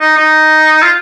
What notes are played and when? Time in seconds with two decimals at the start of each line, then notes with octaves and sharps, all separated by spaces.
0.01 D#4
0.17 D#4
0.82 F4